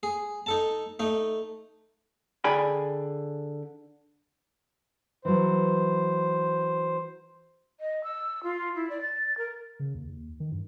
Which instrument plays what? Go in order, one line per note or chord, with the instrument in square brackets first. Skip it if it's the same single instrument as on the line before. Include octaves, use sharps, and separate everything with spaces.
[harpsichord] G#4
D#4 A4 A5
A3 D#4
[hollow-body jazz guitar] D3 G#4 D5 G5 G#5 B5
[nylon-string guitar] E3 F#3 [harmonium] C5
[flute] D#5
E6
F4
E4
D5
A6
A#4
[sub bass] C#3
D#2
D#2
D#3
G2